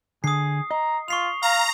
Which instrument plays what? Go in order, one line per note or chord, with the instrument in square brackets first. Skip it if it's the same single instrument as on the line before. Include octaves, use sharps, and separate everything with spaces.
[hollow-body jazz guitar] D3 [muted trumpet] G#4 [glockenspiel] D#6 C7
[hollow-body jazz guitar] D#5 [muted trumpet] A#5
[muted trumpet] F4 [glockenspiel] C#6 C7 F7
[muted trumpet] F5 [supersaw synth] A#5